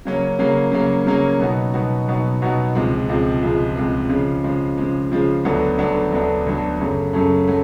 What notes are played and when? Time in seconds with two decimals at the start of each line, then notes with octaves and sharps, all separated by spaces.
0.05 C#3 F#3 A#3 C#4
0.39 C#3 F#3 A#3 C#4
0.72 C#3 F#3 A#3 C#4
1.07 C#3 F#3 A#3 C#4
1.39 B2 F#3 B3 D#4 F#4
1.74 B2 F#3 B3 D#4 F#4
2.08 B2 F#3 B3 D#4 F#4
2.42 B2 F#3 B3 D#4 F#4
2.75 C#2 C3 F3 G#3
3.09 C#2 C3 F3 G#3
3.42 C#2 C3 F3 G#3
3.76 C#2 C3 F3 G#3
4.10 C#3 F3 G#3
4.44 C#3 F3 G#3
4.78 C#3 F3 G#3
5.12 C#3 F3 G#3
5.45 D2 D3 F#3 B3 D4
5.79 D2 D3 F#3 B3 D4
6.12 D2 D3 F#3 B3 D4
6.46 D2 D3 F#3 B3 D4
6.80 F#2 C#3 F#3 A3
7.13 F#2 C#3 F#3 A3
7.48 F#3 A3